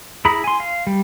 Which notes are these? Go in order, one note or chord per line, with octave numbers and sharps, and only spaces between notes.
E4 G#4 A#5 B5
G#5 C6
F5
G3